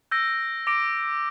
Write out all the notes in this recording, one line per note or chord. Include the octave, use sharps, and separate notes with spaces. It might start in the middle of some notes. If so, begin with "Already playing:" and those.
E6 G6 A#6 D7
D6 A#6 D7